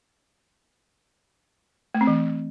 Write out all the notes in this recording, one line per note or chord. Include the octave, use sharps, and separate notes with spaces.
A3
C4
E3